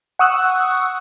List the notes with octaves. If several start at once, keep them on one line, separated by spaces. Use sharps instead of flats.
F#5 C#6 D#6 E6 F#6